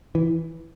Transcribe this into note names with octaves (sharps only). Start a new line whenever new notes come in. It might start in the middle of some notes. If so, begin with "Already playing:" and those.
E3